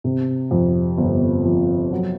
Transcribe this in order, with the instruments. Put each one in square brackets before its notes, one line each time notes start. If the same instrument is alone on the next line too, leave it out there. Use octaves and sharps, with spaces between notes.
[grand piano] C3
F2
G1
F3
F#3